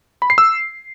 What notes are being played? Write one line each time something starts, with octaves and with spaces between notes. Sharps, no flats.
B5
C7
E6